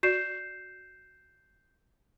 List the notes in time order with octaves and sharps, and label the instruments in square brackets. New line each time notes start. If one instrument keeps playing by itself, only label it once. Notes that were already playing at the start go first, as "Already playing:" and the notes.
[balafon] F#4 D5 [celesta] G6 C7 E7